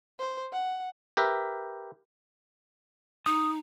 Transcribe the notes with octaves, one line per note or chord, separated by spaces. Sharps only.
C5
F#5
G4 A#4 B4 E5
D#4 D#6